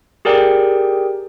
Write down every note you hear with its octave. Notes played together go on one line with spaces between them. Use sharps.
G4 G#4 A#4 D5 G5